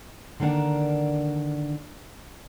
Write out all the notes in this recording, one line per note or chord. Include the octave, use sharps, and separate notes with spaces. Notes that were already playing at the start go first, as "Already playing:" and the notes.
D3 D#3 A#3 D4 F#5